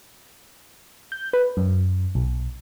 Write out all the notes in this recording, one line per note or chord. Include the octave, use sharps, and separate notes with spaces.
G6
B4
F#2
B1